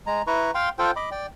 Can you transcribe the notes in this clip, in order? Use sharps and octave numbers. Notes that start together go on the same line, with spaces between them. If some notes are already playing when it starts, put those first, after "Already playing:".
G#3 A#5
E4 B4 A#5 C#6
F5 G5 C6
F4 A4 C5 G5
D#5 B5 D6
D5 G5